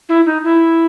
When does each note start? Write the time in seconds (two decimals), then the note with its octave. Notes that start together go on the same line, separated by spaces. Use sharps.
0.09 E4
0.26 D#4
0.44 E4